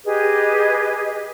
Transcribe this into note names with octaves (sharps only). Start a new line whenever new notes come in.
G4 G#4 B4 D#5